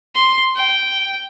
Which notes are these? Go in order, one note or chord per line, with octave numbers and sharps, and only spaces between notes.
C6
G5